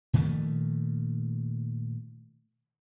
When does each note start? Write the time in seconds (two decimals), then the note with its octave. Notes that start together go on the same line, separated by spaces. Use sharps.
0.13 A#2 D#3 F3 A3